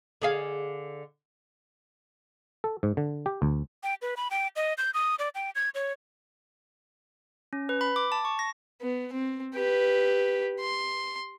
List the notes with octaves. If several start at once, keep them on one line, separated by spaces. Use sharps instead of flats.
D3 G#4 F5
A4
G#2
D3
G4
D2
G5
B4
B5
G5
D#5
G6
D#6
D5
G5
G#6
C#5
C#4
B4
B5
D6
A5
C#6
A#6
B3
C4
G4 B4
C6